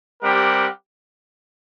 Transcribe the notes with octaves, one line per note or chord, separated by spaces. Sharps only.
G3 C4 G4 A#4 F#5